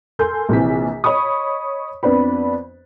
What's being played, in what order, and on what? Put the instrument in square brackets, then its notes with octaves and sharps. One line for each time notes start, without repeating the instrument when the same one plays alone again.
[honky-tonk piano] A4 A#4 G#5 C6 G6
A#1 C3 E3 B6
C#5 D#5 B5 C#6 D#6
F2 B3 D4 B4 B5